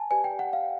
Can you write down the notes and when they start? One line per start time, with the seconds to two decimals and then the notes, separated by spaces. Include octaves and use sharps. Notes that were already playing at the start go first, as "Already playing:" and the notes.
Already playing: G#5 A5
0.10 G4 B4 D5 G#5
0.24 G5
0.39 F#5
0.53 F5